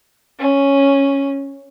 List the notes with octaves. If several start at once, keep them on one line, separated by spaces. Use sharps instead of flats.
C#4